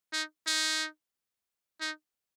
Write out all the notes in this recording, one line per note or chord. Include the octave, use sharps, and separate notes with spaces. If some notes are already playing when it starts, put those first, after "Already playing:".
D#4
D#4
D#4